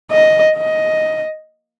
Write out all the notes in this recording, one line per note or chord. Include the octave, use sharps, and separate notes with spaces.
D#5
D#5